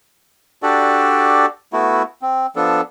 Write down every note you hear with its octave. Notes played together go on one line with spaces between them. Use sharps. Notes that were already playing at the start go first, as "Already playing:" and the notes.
D4 F#4 G4 A4 D5
A3 B3 E4 F#4
C4
F3 B3 D4 A4